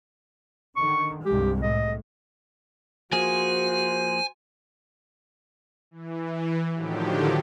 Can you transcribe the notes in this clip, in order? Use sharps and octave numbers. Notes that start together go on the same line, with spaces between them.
D3 D#3 C#6
C2 G2 G#3 G4
A2 D#5
F3 A#3 F#4 G#4 C5 G#5
E3
A2 D3 D#3 F3 F#3 G4